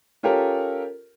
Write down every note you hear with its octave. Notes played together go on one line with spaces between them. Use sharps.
C#4 F4 G4 A4 A#4